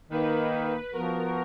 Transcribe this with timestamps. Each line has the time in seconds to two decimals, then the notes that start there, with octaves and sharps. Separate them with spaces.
0.10 D#3 A#3 D#4 B4
0.93 F3 B3 F#4 A#4